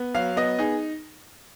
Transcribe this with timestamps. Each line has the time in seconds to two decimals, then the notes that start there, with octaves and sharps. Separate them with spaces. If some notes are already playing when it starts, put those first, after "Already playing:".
Already playing: B3
0.15 F#3 F5
0.36 B3 D#5
0.58 D#4 G#4